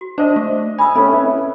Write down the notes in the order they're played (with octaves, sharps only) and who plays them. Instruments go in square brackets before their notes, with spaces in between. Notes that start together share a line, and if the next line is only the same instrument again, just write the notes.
[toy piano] F#4
[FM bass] D4 [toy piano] C5 [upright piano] D5 D#5
[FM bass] A3
[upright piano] G#5 [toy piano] B5 D#6 E6
[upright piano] A3 C#4 [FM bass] C4 [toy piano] B5
[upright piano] C#4 E4 B4